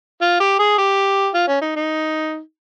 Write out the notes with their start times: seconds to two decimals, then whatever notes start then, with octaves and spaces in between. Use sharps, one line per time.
0.22 F4
0.40 G4
0.59 G#4
0.78 G4
1.34 F4
1.48 C#4
1.62 D#4
1.76 D#4